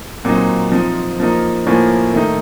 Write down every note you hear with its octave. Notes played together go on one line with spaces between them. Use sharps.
A#2 F#3 C4 D#4
F3 C4 D#4
F3 A#3 D#4
A2 F3 A#3 C#4
D#3 A3 D#4